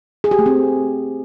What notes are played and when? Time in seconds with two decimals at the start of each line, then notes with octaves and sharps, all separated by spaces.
0.24 G#4
0.31 G4
0.39 A3
0.46 C4